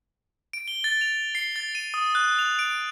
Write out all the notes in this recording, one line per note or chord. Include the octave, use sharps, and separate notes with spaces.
D7
G7
A6
F7
C7
A6
D#7
D#6
F#6
F7
D7